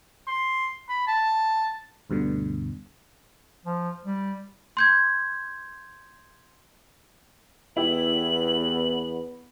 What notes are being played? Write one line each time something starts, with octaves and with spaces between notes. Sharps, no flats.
C6
B5
A5
D2 G2 B2 D3
F3
G3
C6 G6 G#6
E2 B3 E4 G4 F#7